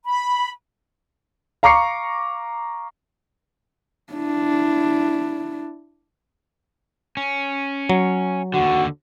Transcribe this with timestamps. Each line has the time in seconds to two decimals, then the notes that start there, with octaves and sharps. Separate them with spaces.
0.05 B5
1.63 F5 A#5 C#6 D6 C7 C#7
4.13 D4 E4
7.17 C#4
7.89 F#3
8.54 D#2 D3 F#4